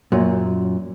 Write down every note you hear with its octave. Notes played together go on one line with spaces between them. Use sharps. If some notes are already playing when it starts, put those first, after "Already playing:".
F#2 A#2